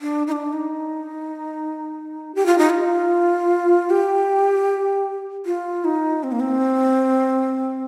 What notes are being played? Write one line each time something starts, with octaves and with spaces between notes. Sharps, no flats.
D4
D#4
D4
D#4
G4
F4
D#4
F4
G4
F4
D#4
C4
A#3
C4